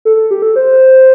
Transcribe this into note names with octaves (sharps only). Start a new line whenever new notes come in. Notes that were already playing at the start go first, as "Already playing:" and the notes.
A4
A4
G4
A4
C5